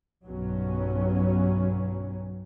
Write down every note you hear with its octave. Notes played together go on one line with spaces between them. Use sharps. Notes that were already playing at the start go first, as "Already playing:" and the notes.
B1 G2 F#3 B3 C#4